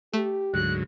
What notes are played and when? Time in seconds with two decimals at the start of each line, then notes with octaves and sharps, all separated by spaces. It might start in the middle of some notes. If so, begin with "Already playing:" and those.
0.14 A3 G4
0.54 D2 G#2 F#3 F#6